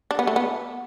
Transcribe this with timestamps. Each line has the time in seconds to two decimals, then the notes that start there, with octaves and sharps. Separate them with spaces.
0.11 D4
0.19 B3
0.27 A3
0.36 B3